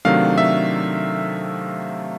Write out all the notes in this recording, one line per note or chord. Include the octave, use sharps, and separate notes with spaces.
C3 D#3 F#3 A3 D4 F5
E5